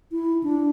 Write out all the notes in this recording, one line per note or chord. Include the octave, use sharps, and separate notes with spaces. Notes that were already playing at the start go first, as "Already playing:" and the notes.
E4
D4